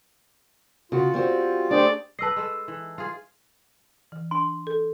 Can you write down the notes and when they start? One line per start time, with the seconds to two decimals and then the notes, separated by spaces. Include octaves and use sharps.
0.92 C#3 F4 F#4
1.14 G3 C4 F#4
1.71 A3 D4 G4 G#4 C5 D5
2.19 B4 D#5 A5 E6 C7
2.37 G#3 A4
2.68 E3
2.98 F4 G#4
4.12 E3
4.31 D4 C6
4.67 A4